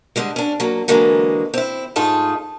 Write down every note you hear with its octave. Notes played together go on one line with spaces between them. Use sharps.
D3 G3 G#3
C#4 D4
F#3 A#3
D3 E3 F#3 G#3 A#3
C4 E4
G#2 A3 D#4 F4 G#4 A5